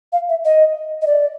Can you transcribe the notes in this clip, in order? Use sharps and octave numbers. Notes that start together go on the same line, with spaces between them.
F5
E5
D#5
D#5
D5